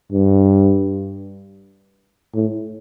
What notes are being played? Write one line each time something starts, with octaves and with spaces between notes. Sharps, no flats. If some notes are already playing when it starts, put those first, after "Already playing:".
G2
A2